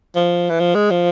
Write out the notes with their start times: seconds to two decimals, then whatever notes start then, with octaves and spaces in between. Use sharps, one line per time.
0.15 F3
0.50 E3
0.60 F3
0.75 G#3
0.90 F3